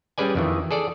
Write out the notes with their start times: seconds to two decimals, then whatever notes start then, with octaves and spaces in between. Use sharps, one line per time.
0.18 G3 C#4 G#4 B4 D5 G#5
0.35 F2 D#3 E3
0.71 G#4 A4 D5